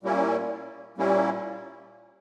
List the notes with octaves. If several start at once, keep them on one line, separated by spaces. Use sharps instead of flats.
A#2 G3 A#3 C#4 E4
A#2 G3 A#3 C#4 E4